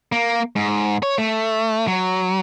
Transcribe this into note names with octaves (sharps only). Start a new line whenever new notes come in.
A#3
G#2
C#5
A3
F#3